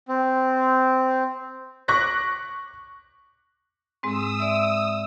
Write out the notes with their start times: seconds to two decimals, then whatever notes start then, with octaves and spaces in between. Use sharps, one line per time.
0.08 C4
1.88 C#6 D6 F#6 A#6 B6
4.03 G#2 G#3 C4 D#6 E6
4.40 D5 E5